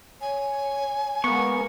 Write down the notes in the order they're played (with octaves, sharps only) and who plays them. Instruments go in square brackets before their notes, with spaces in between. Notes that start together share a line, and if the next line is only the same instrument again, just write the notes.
[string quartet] C#5 [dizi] G#5
[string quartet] G#3 A#3 [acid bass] B3 [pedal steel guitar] C#6